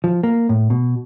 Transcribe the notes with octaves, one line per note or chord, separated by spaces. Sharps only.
F3
A#3
A2
B2